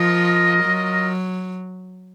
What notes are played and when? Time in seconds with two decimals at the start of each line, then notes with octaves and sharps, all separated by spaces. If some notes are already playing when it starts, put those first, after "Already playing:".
Already playing: F3 F4 A#4 D#5
0.64 F#3